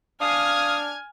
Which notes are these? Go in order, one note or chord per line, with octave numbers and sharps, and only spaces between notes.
D4 F5 G#5 D#6 F6 G#6